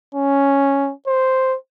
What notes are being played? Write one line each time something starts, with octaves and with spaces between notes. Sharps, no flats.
C#4
C5